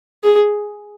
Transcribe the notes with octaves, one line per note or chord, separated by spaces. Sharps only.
G#4